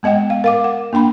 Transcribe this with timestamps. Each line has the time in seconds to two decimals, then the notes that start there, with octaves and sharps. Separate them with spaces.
0.03 G#3 B3 D#5 F#5 G5
0.30 F5
0.44 A#4 F5 D6
0.64 F#5
0.93 A#3 D4 G5 B5